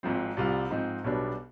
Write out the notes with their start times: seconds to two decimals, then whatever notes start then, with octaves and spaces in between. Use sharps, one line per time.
0.03 G#1 G#2 F3 C4
0.37 C2 C3 G3 C4 F4
0.71 G#2 F3 C4 D#4
1.04 B1 B2 G3 B3 D4